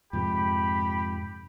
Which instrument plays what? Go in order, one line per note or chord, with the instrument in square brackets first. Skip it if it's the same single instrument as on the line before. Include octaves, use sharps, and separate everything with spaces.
[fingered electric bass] F2 G#2 C3 [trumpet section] G4 B5